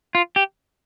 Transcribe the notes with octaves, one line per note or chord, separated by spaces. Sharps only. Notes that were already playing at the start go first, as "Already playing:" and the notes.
F4
G4